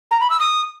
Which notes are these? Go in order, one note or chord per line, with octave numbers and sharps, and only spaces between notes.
A#5
B5
E6
D#6